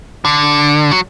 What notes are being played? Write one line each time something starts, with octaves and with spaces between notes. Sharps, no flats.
D3
F#3